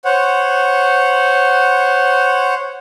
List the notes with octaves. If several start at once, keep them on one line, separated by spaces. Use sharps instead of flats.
C5 C#5 F#5